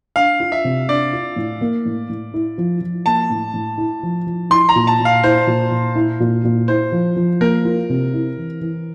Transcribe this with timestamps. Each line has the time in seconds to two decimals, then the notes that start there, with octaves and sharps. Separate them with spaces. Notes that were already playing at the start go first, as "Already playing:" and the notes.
0.16 D4 F5
0.40 F4
0.52 E5
0.64 C3
0.88 D4 D5
1.13 F4
1.36 A2
1.61 A#3
1.85 A2
2.09 A2
2.34 E4
2.58 F3
2.81 F3
3.06 A#3 A5
3.30 A2
3.54 A2
3.78 E4
4.03 F3
4.27 F3
4.50 E4 C6
4.69 A#5
4.76 A#2
4.87 A5
5.00 A#2
5.05 F5
5.24 E4 C5
5.47 A#2
5.71 A#2
5.96 E4
6.20 A#2
6.44 A#2
6.68 E4 C5
6.92 F3
7.17 F3
7.41 A#3 A#4
7.65 F4
7.90 C3
8.14 E4
8.38 E3
8.61 E3